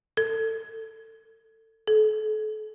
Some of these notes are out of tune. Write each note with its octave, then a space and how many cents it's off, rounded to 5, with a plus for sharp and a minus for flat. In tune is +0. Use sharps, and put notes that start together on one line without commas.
A4 +25
A4 -35